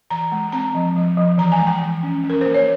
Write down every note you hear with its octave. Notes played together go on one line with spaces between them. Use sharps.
E3 A#5
G#3
C4 A#5
F3
F3
F3
E3 A#5
G#5
G#3
G5
E3
C#4
C#4
A#4
A#3 C5
C#5